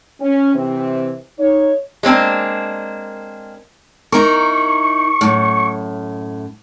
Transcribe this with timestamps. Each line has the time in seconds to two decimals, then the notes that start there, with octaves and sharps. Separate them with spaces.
0.20 C#4
0.55 C3 E3 C4
1.39 D#4 C#5
2.03 G#3 A#3 C4 D4
4.12 D#4 E4 A#4 C#6
5.21 F#2 A2